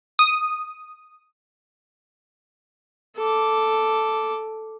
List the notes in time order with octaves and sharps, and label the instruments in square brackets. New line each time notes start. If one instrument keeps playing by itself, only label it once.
[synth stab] D#6
[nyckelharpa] A4 D6